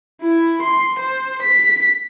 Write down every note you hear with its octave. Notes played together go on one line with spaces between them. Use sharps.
E4
C6
C5
B6